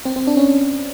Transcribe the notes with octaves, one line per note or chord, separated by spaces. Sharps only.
C4
C4
D4
C#4